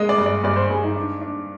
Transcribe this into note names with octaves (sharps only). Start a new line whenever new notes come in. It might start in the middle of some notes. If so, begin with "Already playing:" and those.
Already playing: G#3 A#3 D#5
D5
G2
D5
G2 D5
C5
G2 G#4
D#4
D4
D4